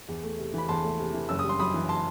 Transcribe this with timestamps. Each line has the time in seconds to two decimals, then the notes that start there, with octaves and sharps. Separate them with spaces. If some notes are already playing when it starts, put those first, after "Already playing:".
0.08 E2
0.23 A3
0.39 C3
0.54 E3 B5
0.69 E2 A5 C6
0.84 A3
0.99 C3
1.14 E3
1.29 F#1 E6
1.39 G3 D#6
1.49 C6
1.59 F#2 B5 D#6
1.74 E3
1.89 A5 C6